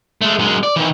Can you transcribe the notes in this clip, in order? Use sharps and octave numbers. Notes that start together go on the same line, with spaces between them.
G#3 A3
F#2 G#3
D5
D#3 E3